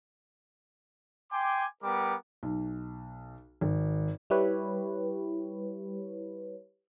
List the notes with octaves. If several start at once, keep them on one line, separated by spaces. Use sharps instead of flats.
G5 G#5 C6 D6
G3 B3 A#4 G5 D6
B1
G#1
G3 E4 G4 B4 C#5